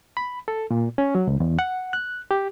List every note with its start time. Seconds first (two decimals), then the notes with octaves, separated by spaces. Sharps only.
0.17 B5
0.48 A4
0.71 A#2
0.98 C#4
1.15 F#3
1.27 C#2
1.40 E2
1.59 F#5
1.93 F#6
2.31 G4